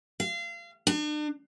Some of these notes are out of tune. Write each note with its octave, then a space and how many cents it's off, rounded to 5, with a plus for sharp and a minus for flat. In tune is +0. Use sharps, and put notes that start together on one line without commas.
F5 -30
D4 +40